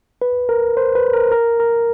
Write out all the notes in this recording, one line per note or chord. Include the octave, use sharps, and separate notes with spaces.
B4
A#4
C5
B4
A#4
A#4
A#4